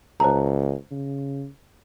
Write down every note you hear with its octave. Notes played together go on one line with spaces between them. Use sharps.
C#2 C5 A5 A#5
C#3